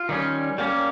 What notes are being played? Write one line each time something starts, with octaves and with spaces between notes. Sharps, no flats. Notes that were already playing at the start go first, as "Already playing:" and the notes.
Already playing: F4
D#3 G3 C#4
G3 A#3 C#4